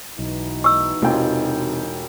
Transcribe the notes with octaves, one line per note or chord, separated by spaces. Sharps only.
B1 B2 E3 D#4
C#6 E6
E1 C3 F4 G5